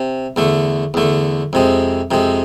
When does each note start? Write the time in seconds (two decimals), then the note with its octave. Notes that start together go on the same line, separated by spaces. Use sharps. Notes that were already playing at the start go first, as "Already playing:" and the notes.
Already playing: C3
0.36 E2 D3 A3
0.94 E2 D3 A3
1.53 F2 C3 G#3
2.11 F2 C3 G#3